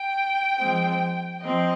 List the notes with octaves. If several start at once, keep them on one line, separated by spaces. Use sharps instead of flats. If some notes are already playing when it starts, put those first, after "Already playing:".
Already playing: G5
F3 G#3 C4
F3 C4 D#5